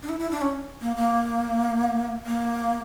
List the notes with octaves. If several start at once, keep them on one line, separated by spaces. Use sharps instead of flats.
D4
E4
E4
D4
C#4
A#3
A#3
A#3